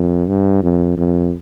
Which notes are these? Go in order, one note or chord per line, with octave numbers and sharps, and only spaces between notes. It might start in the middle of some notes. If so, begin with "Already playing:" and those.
Already playing: F2
G2
F2
F2